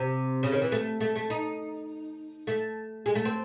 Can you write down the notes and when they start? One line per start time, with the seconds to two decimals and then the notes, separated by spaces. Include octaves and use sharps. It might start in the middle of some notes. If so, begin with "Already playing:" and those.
Already playing: C3
0.43 C#3
0.52 D#3
0.62 E3
0.72 A3
1.00 A3
1.16 A3
1.30 D#4
2.47 A3
3.06 G#3
3.15 A3
3.25 C4